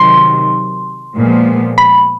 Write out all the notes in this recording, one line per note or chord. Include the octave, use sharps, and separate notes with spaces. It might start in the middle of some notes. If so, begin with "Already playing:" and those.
Already playing: C3 D#3 F#3 C6
A#2 F3 G#3 B3
B5